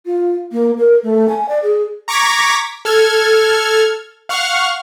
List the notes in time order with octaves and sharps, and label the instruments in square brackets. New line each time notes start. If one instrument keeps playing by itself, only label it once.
[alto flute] F4
A#3
A#4
A3
G#5
D5
G#4
[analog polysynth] A#5 C#6 D6 G#6 A#6 B6
A4 F6 G#6
F5 F#5 C#6 F6